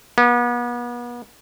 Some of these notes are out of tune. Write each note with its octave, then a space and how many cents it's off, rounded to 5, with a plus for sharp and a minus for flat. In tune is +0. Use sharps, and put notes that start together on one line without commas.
B3 -35